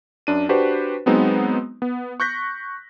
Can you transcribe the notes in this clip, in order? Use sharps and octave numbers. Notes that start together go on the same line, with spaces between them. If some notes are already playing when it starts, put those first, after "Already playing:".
F#2 D4 D#7
D4 F#4 G4 B4 C5
F#3 G#3 B3 C4 D#4
B3
C#6 F#6 G6 A#6 B6